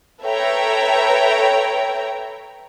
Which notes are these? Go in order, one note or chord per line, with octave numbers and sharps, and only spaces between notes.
A4 B4 C#5 E5 G5 A#5